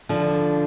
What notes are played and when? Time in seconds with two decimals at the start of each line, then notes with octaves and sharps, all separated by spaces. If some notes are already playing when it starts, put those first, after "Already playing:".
0.09 D3 F3